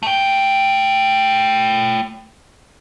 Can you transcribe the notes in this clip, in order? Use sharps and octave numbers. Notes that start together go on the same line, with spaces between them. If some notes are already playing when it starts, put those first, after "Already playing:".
A3 G5